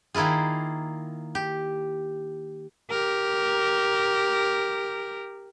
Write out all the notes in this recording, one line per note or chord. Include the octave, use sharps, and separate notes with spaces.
D#3 A#3 E4 F4 G#4
G4
G4 A#4